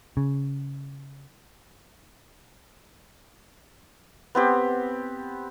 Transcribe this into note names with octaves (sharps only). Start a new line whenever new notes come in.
C#3
B3 C4 G4